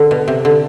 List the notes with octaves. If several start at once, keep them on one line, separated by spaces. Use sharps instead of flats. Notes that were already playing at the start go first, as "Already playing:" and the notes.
Already playing: D3
B2
C3
D3